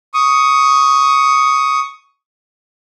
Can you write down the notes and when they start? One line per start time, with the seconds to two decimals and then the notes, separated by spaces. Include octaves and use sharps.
0.14 C#6 D#6